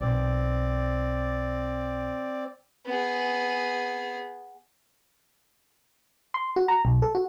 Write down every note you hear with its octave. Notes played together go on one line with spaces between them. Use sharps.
B1 C4 D5
B3 G#4
C6
F#4
A#5
B1
A4
F#4